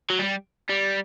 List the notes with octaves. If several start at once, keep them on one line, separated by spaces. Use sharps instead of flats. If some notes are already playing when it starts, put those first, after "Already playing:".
F#3
G3
G3